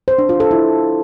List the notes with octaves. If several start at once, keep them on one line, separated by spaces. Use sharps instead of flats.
C5
D4
F4
A4
E4